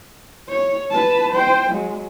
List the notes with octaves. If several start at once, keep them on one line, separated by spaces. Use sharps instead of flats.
C#5
B4 A5
C5 G5
F#3 G#3